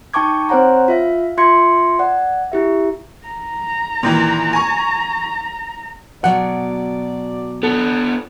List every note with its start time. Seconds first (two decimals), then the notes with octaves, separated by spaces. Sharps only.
0.14 D#4 G5 A5 C#6 D6 G#6
0.49 C4 C5 C#5 F#5 A#5
0.88 F4 E5 F5
1.37 F4 E5 C6 G#6 C#7
1.99 D5 F#5
2.52 E4 G4 E5
3.27 A#5
4.03 A#2 D#3 E3
4.53 G#5 C#6
6.24 B2 F#3 D5 F#5
7.63 B3 D4 A4